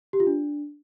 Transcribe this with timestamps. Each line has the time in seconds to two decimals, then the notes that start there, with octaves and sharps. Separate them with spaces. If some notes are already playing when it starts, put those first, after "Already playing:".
0.13 G4
0.20 F4
0.27 D4